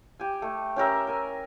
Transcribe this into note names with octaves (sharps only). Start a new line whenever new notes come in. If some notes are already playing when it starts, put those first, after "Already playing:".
G4 G#5
A3
C#4 G4 A#4 E5
A#4 G#5